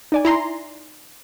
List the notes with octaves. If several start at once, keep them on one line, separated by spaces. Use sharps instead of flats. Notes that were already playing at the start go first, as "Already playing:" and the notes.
D#4 D5 G#5
E4 A#5 C6